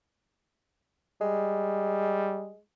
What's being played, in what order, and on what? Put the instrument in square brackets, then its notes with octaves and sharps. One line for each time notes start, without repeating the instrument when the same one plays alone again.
[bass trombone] G3 [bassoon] G#3